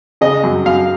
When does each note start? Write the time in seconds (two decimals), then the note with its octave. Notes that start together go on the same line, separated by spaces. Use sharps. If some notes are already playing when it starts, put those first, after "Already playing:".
0.21 C#3 D#5
0.44 F#2
0.66 F#2 F5